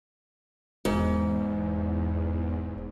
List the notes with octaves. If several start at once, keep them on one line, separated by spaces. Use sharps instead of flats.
E1 E2 G#2